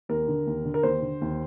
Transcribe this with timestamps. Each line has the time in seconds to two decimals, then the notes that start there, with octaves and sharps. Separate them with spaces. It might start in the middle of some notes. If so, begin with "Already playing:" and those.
0.09 D#2 A#4
0.28 D3
0.47 D#2
0.65 D3
0.74 A#4
0.83 D#2 C5
1.02 D3
1.21 D#2